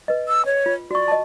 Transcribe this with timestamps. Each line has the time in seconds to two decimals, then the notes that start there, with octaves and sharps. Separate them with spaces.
0.08 B4 D#5
0.28 E6
0.46 C#5
0.66 F4
0.91 F#4 D5 C#6
1.08 D#5 A5